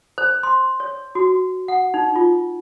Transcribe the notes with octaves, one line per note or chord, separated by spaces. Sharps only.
C5
C6
C#5
F#4
F#5
D#4
F4